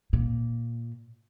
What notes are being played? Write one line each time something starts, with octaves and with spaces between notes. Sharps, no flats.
A#2